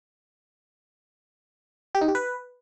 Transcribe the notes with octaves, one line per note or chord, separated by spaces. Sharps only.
G4
D#4
G4
B4